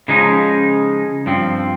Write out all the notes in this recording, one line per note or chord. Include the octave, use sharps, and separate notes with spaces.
C#3 F3 G#3 D#4
G2 F3 C4